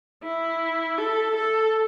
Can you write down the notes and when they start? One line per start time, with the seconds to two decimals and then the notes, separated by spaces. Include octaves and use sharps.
0.23 E4
0.98 A4
1.36 A4